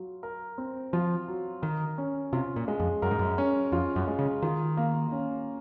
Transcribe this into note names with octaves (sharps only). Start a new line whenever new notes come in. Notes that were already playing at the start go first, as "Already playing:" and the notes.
Already playing: F#3 F4
A#4
C4
F3 F4
F#3
D#3 A#4
C#4
C3 F4
A#2
G#3
F2
F#2 A#4
G#2
F#2
C#4
F2 F4
F#2
G#3
C#3
D#3 F4
A#3
C#4